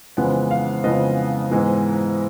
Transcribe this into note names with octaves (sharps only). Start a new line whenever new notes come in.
F2 C#3 E3 G#3 B3 F#5
F5
F2 C#3 E3 G#3 B3 D#5
G#2 E3 G#3 B3